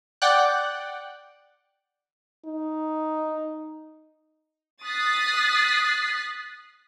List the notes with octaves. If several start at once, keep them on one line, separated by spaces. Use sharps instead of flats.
D5 F#5 G5 F#6
D#4
D#6 F#6 A6 B6 C7